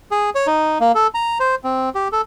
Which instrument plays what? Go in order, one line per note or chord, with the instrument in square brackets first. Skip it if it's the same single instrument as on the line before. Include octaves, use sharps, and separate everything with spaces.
[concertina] G#4
C#5
D#4
A#3
A4
A#5
C5
C4
G4
A4